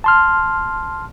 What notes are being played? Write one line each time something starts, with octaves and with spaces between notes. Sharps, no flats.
A5 C6 F6